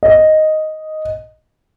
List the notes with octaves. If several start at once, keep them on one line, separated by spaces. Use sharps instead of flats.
D#5